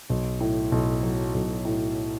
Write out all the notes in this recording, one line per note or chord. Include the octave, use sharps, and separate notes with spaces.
B1
A2
B1
F#3
B1
A2